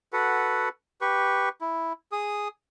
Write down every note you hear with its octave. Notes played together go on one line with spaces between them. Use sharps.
F#4 A4 B4 F#5
G4 B4 C#6
E4
G#4 D#6